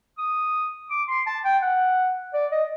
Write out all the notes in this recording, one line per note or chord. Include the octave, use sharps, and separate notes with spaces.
D#6
D6
C6
A5
G5
F#5
D5
D#5